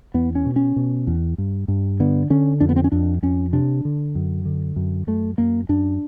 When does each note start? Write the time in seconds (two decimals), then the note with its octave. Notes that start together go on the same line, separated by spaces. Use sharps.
0.14 E2 B3
0.35 C#4
0.45 B2
0.56 C#4
0.76 B2
1.07 E2
1.38 G2
1.68 G2
2.00 D3 B3
2.30 D3 C#4
2.60 F2 D4
2.69 B3
2.76 C4
2.84 C#4
2.92 F2 D4
3.23 F2 C#4
3.53 C3 D4
3.85 D3
4.15 F#2
4.45 D3
4.76 F#2
5.07 F#2 A3
5.38 F#2 A#3
5.69 F#2 D4